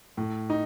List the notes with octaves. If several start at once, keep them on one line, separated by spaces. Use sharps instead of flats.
A2
D#4